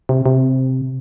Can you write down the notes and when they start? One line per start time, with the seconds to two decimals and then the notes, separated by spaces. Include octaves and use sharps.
0.09 C3
0.26 C3